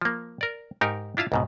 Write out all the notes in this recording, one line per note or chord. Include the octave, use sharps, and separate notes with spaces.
F3 A#3
A#4 D5
G#2 D#4 G4 A#4
D4 E4 F4 F5 A5
C#2 G#2 B2